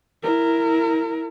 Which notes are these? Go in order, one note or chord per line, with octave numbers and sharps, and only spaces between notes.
E4 A#4